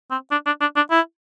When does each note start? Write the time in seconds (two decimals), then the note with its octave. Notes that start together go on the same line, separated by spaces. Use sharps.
0.11 C4
0.31 D4
0.46 D4
0.61 D4
0.76 D4
0.91 E4